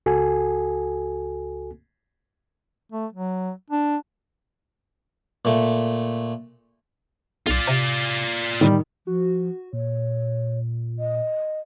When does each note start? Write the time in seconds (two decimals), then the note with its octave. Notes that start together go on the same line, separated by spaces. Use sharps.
0.06 C#2 F#4 A4 G#5
2.92 A3
3.13 F#3
3.70 D4
5.45 A#2 A3
7.47 B1 F4 D5
7.67 C3
8.61 A2 D#3 G3
9.07 F3 F#4
9.73 A#2 C#5
10.99 D#5